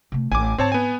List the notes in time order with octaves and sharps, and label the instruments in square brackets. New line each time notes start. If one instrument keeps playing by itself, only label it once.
[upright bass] C3 A3
[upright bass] A1 [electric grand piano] G#5 D6
[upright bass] G#2 [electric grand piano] C4 C#5 A5
[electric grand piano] B3 G#5